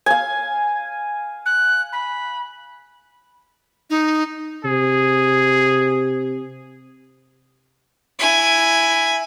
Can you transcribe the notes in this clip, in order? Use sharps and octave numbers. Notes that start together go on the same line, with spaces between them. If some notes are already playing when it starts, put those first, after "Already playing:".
F5 G#5
F#6
B5
D#4
C3 G#4
E4 G#5